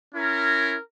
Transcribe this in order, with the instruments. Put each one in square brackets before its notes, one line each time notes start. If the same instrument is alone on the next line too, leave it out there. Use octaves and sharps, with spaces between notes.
[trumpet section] C#4 E4 A#4